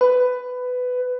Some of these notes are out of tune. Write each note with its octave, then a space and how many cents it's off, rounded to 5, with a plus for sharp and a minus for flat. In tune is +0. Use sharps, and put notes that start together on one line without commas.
B4 +15